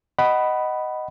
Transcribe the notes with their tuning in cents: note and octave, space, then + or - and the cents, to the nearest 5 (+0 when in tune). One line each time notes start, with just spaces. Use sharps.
D#5 +0 F#5 +20 B5 +0